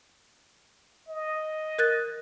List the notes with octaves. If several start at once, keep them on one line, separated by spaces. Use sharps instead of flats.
D#5
A#4 F#6 A6